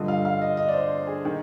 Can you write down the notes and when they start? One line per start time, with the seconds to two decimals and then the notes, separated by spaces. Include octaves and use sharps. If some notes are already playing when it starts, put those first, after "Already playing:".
Already playing: G2 D3 F3 D#5
0.08 F5
0.25 F5
0.42 D#5
0.57 D#5
0.68 D5
0.74 C5
1.07 G#4
1.25 D#3